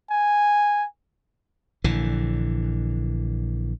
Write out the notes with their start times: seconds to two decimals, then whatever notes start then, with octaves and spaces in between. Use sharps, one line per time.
0.11 G#5
1.84 A#1 D3 E3